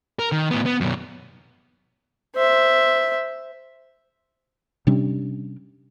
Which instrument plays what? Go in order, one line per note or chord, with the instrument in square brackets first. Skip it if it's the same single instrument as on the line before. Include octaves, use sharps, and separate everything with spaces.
[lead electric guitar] A#4
D#3
A2 B3
B3
F#2 B2
[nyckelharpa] C5 E5
[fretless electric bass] C3 G3 C#4 D4